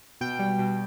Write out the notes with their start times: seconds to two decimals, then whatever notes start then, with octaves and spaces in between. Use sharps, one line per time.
0.21 B2 G5
0.39 G3
0.59 B2